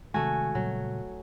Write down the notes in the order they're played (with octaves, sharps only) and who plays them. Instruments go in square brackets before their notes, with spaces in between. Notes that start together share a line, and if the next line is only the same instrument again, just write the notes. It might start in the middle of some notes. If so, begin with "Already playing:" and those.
[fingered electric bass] C3 D#3 G#3 [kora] A3 F#4 [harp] G#5
[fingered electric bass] A#2 C#3 G3 [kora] F#3